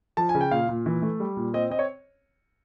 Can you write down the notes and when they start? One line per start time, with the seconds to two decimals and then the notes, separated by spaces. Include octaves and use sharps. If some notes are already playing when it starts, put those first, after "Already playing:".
0.17 F3 A5
0.29 G#5
0.35 C#3
0.41 G5
0.51 A#2 F5
0.68 A#2
0.86 E3
1.02 A3
1.20 G3
1.37 A#2
1.54 C4 D#5
1.70 C4 D#5
1.79 C#5